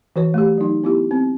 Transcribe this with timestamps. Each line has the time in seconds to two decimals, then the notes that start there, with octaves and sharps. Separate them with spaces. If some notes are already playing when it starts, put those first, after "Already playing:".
0.16 E3 F#4 B4 C#5
0.34 A3 G4
0.58 F#3 D#4
0.84 B3 E4 G4
1.11 C4